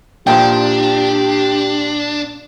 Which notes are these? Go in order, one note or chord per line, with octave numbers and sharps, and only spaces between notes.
A#1 A#2 F3 D4 G4 G5